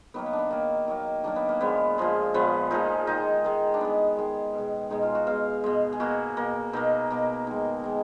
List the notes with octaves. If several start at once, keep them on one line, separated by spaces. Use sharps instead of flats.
D#3 F#3 A#3 B3
B3
D4
B3
D#3 F#3 A#3
D#3 F#3 A#3
D#3 F#3 A#3 D4
B3
A#3
A#2 F3 G#3 B3
A#2 F3 G#3
A#2 F3 G#3 B3
A#2 F3 G#3 D#4
D#3 G#3 D#4
D#3 G#3
D4
D#3 G#3 B3
D#3 G#3
B2 G#3
B2 G#3 D#4
F4
F#4
B2 G#3 F5
B2 G#3
G#4
B2 A#3 F#4
B2 A#3
B2 A#3 D#4
B2 A#3
D#3 G#3
D#3 G#3